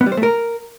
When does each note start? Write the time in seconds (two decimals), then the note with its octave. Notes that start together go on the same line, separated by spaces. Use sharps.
0.01 B3
0.06 G3
0.12 C5
0.17 A3
0.23 A#4